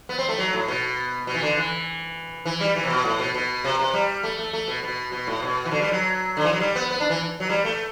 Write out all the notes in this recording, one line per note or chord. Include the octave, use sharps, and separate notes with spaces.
B3
C4
A3
F#3
A2
B2
B2
E3
D3
E3
E3
G3
E3
C3
B2
A2
B2
B2
C3
C3
G3
A3
A3
A3
B2
B2
B2
A2
B2
E3
D3
G3
F#3
D3
E3
F#3
G3
B3
B3
D4
E3
F#3
G3
A3